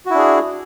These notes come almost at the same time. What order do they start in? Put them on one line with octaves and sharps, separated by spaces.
F#4 E4 D4 G#4